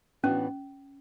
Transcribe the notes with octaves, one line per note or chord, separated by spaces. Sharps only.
A2 E3 B3 C#4 D4 F#4